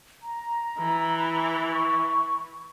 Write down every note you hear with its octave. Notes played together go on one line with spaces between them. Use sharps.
A#5
E3
C#6